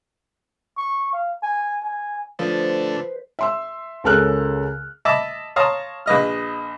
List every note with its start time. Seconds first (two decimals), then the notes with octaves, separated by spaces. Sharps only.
0.78 C#6
1.13 F5
1.43 G#5
1.83 G#5
2.39 D3 F3 A3 B4 C5
3.39 E5 C6 E6
4.04 C#2 C#3 A4 A#4 F6 F#6
5.05 D#5 E5 A5 B5 D6 E6
5.56 C#5 F5 A5 A#5 C6 D#6
6.06 A#1 B4 D#5 F6